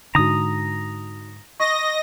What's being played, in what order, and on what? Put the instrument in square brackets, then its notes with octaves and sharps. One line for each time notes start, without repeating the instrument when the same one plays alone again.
[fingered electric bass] G#2 D3 [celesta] D#4 F#4 [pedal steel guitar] A#5 D#6
[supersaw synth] D#5 A#6 [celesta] C#6